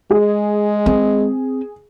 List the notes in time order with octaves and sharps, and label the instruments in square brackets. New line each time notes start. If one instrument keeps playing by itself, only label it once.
[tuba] G#3 [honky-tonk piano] G#4
[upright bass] C4